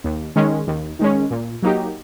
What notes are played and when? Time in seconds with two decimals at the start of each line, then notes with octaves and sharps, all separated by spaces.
0.04 D#2
0.36 D#3 G#3 C#4
0.67 D#2
0.99 D#3 G#3 C#4
1.31 A#2
1.63 F#3 A#3 D#4 G4